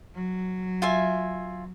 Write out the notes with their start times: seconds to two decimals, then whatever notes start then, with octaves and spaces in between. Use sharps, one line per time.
0.15 F#3
0.82 F4 E5 G#5